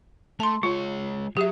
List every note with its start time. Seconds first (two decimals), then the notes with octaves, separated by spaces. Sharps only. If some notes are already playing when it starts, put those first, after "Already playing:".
0.40 A3 A5 C6
0.63 G#3 F4 C#5
1.37 F#3 G4 G#4 E5